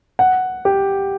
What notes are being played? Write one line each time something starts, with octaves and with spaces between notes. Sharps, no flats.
F#5
G4